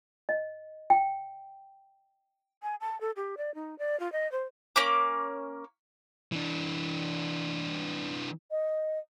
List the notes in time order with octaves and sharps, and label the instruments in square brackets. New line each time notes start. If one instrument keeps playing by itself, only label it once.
[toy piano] D#5
G5
[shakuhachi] G#5
A5
A4
G4
D5
D#4
D5
F4
D#5
C5
[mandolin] A#3 C#4 D6
[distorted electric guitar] E3 D4
[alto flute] D#5